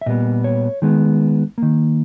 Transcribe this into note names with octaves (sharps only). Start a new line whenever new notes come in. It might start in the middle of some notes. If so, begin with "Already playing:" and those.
E5
A#2 G3 B3 D#5
C#5
D#3 G#3 B3
D#3 A#3